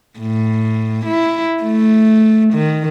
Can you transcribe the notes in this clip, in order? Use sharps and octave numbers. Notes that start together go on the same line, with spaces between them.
A2
E4
A3
D#3